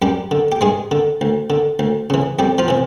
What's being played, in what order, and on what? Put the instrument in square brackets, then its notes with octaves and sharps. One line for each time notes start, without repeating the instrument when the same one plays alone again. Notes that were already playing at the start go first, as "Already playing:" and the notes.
[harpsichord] F#2 G3 G4
D3
G4
G2 G#3 G#4
D3
D2
D3
D2
C#3 E3
F2 G3 G4
F3 F4
C3 E3